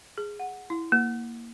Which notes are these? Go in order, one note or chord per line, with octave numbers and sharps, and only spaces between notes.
G#4
F#5
E4
A#3